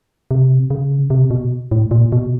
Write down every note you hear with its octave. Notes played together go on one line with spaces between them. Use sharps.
C3
C#3
C3
B2
A2
A#2
B2